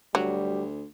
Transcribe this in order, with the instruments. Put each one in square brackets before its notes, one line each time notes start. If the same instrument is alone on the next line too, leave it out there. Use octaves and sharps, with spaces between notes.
[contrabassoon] D2 [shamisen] F#3 [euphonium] G3